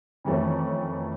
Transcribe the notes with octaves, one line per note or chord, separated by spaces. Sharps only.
F2 D#3 E3 A3 C#4